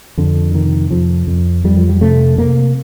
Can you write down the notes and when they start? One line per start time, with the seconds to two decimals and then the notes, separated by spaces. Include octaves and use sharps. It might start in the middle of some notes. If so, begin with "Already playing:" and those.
0.17 F2 D3
0.54 C3 D#3
0.91 F2 F3
1.27 F2
1.64 F2 G3
1.77 F3
1.89 G3
2.01 C3 A3
2.38 C3 A#3